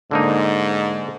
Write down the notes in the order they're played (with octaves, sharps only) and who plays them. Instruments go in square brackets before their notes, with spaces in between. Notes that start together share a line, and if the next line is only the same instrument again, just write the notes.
[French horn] G#2 [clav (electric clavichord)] D3 A#3 D#4